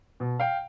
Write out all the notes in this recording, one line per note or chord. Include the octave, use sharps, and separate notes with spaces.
B2
F5 G5